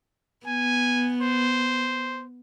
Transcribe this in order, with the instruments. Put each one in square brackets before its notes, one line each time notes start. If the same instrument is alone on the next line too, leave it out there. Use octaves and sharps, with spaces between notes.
[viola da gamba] B3 [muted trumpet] G#5
[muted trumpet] C5